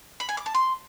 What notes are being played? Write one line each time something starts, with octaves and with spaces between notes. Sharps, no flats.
B5
G#5
D6
A5
C6